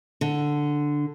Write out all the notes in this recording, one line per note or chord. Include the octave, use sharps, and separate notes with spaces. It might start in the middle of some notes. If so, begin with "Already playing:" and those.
D3